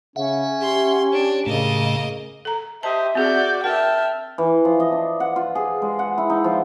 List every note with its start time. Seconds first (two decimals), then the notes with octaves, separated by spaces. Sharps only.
0.16 C#3 C#4 E5 F#5
0.62 G4 C6
1.13 D4 C#5
1.46 A2 C#3 A3 A#3 D#5
2.45 A4 A#5
2.83 G4 C5 D#5 E5 A5
3.15 C4 F#4 G#4 D5 G6
3.64 A#4 E5 G5 A5 F6
4.38 E3
4.65 F3
4.80 D#5
4.92 D4
5.20 F#5
5.36 F4
5.55 G#4
5.82 G#3
5.99 F#5
6.18 E4
6.30 D#4
6.44 F3